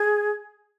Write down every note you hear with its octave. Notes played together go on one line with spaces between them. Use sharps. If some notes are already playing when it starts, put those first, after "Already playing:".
Already playing: G#4